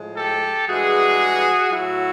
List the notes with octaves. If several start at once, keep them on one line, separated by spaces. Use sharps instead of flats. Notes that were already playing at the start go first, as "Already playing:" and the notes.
Already playing: A2 F3 G#3
G4 A4
G2 E3 G#3 F#4 G#4
A2 F#3 E4 F#4